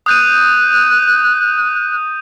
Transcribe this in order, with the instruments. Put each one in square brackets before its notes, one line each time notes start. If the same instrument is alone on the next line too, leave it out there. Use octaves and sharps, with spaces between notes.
[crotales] D#6 G6 D#7 [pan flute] F#6